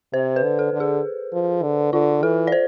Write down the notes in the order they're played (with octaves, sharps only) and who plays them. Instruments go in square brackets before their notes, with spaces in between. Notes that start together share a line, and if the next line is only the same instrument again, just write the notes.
[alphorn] C3 [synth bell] C5
[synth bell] B4
[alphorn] D3
[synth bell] A4
[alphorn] D3
[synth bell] G#4
[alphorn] F3
D3
[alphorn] D3 [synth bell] F4
[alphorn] E3 [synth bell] A4
[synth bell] D5
C5